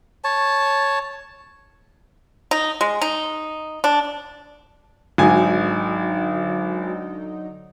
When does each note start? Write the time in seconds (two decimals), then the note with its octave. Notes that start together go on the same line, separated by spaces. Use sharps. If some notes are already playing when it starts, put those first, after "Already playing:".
0.24 C#5 A5
2.51 D#4
2.81 G#3
3.02 D#4
3.84 D4
5.18 G#1 D3 F#3 D#4 G#5